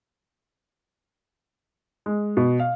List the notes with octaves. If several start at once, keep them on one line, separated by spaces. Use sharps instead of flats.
G#3
B2
F5